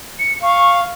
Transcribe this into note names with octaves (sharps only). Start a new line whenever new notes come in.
C#7
F5 C#6